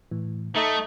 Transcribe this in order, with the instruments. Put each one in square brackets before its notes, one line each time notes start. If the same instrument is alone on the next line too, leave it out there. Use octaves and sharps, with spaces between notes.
[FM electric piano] A2 E3
[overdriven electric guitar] A3 [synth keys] D#4 A4 D#5 [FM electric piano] E5 C#6